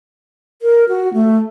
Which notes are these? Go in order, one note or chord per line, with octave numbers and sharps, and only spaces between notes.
A#4
F#4
A3